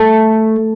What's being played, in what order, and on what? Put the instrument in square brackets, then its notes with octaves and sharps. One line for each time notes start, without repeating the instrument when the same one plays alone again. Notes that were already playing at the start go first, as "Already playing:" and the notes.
Already playing: [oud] A3